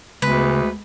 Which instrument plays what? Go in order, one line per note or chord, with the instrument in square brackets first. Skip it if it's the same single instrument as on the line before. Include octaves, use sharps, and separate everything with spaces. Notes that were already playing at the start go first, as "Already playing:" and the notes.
[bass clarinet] D2 [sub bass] C#3 [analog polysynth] G#3 B3 G#4 [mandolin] B4